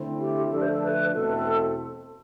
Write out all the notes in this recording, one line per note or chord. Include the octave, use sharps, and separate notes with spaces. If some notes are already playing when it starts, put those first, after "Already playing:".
Already playing: D3 A3 C4 E4
G4
D3 F3 A3 D4 A4
C5
A4
B4
E2 B2 A3 C4 A4